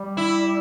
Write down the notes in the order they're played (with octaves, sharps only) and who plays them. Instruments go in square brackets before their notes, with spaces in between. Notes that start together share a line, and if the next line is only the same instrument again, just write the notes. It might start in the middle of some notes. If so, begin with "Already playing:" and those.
Already playing: [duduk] G3
[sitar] E4